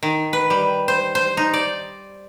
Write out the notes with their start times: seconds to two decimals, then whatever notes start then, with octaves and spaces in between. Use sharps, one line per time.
0.03 D#3
0.33 B4
0.50 G3
0.88 C5
1.15 C5
1.37 D#4
1.54 D5